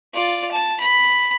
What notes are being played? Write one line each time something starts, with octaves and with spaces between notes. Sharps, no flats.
F4 D5
A5
B5